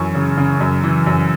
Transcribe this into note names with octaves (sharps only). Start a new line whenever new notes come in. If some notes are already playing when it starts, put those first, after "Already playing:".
Already playing: F#2 E3 C#6
C#3
C#3
F#2
E3
F#2